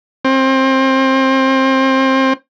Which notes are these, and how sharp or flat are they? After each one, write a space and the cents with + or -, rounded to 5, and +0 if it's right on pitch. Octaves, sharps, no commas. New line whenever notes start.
C4 +25